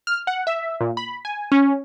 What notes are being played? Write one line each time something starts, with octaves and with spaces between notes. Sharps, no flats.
F6
F#5
E5
A#2
B5
G#5
C#4